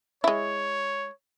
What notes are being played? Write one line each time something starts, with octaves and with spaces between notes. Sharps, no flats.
G#3 E4 C#5